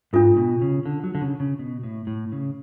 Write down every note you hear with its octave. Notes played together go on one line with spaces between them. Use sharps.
G#2 D4 F4 A4
B2
C#3
D3
F#3
D3
C#3
C#3
B2
A2
A2
C#3